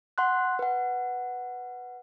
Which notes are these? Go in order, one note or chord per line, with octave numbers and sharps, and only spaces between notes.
F#5 C6 F#6
B4 F#5